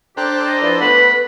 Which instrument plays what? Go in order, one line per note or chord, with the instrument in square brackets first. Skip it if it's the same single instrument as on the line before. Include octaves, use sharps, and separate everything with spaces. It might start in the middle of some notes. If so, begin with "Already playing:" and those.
[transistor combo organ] D4 A4 C5 [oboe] G4 [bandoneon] G5 A#5 F#6
[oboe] D#5
[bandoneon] F3 E4 [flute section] B4 D5
[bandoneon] A3 B3 F#5 [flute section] B4 [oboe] B5